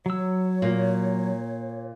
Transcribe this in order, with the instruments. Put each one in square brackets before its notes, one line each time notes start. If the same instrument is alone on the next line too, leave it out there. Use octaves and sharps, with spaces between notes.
[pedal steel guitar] F#3 E6 [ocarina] C#5
[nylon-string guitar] A#2 A#3